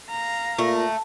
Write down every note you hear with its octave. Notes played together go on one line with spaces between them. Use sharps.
F5 A#5
A#2 A3